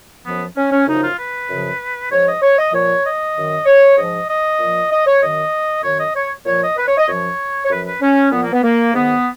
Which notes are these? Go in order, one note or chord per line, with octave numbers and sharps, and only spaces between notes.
F#2 F3 B3
C#4
C#4
F#2 C#3 F3 D#4
F4
B4
F#2 C#3 F3
G#2 F3 C#5
D#5
C#5
D#5
A#2 F3 C#5
D#5
F#2 D#3
C#5
G#2 F3 D#5
D#5
A#2 F3
D#5
C#5
F#2 D#3 D#5
F#2 D#3 C#5
D#5
C#5
A#2 F3 C#5
D#5
B4
C#5
D#5
F#2 F3 C#5
C#5
F#2 F3 B4
B4
C#4
A#2 F3 B3
A#3
B3
A#3
G#2 D#3 B3